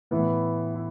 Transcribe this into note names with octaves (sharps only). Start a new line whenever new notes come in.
A2 E3 B3 E4
E4